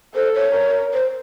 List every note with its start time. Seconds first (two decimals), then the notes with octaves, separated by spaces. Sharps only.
0.15 A4 C5
0.35 C#5
0.54 A#4
0.93 C5